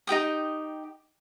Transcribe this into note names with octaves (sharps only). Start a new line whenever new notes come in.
D#4 G4 G5 D#6